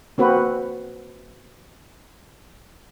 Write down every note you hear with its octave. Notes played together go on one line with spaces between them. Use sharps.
A#3 C4 F#4 B4